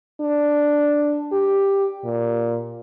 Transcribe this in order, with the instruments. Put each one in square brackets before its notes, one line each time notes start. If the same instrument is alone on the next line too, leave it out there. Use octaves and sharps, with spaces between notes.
[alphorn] D4
G4
A#2